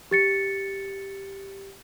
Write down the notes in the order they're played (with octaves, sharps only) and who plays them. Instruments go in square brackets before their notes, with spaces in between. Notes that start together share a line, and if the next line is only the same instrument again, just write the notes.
[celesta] G4 A6 C#7